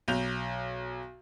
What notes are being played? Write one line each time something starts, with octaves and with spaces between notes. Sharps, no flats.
B1 G6 F7